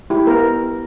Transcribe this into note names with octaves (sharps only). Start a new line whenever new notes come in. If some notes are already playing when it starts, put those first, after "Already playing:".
E4 G4
B3 A#4